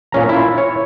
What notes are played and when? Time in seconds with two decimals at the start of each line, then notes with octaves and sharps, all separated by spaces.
0.12 A#2 C#4 A#5
0.29 E4 F4
0.58 C#5